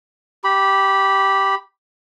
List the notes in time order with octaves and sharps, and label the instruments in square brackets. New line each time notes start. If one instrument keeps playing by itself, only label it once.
[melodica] G4 B5